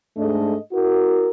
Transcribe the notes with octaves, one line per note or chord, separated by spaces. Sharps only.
G#2 G#3 A3 D4 A4 D#5
E4 F#4 A#4